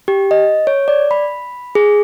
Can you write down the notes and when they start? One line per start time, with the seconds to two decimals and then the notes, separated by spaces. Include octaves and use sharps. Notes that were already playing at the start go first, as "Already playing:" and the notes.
0.08 G4
0.31 D#5
0.67 C#5
0.88 D5
1.11 B5
1.75 G#4